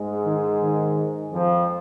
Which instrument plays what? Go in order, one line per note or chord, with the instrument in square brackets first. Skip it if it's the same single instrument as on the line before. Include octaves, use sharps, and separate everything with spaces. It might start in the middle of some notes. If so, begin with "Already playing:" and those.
Already playing: [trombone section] G#2 G#3
[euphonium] D#3
D#3
[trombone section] F2 F3